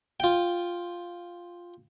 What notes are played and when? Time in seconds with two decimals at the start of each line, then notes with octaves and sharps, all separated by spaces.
0.20 F4 G5